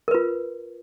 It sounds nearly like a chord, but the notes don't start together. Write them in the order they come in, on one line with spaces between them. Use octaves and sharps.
A#4 B4 F4